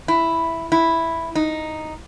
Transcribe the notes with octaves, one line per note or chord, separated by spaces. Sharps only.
E4
E4
D#4